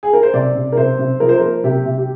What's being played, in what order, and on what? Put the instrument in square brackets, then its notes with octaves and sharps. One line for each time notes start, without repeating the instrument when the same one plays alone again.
[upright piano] G#4
A#4
C5
C3 D5
C3
A#4
C3 C5
C3
F3 A#4
C5
A#4
A#3
C3 G4
C3
G4